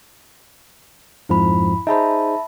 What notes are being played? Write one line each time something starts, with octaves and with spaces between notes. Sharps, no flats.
F2 G#2 F3 E4 B5
D#4 G#4 C5 E5 A5 B5